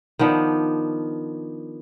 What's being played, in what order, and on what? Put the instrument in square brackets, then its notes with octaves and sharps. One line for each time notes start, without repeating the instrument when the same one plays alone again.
[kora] D#3 F3 B3 D4